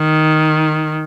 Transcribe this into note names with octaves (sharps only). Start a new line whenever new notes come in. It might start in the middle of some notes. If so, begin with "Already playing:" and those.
Already playing: D#3